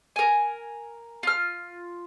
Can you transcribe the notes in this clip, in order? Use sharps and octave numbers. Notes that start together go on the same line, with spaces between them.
A#4 G#5
F4 F6